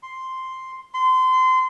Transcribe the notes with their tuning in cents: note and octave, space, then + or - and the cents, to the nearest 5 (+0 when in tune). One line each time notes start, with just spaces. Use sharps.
C6 +0
C6 -25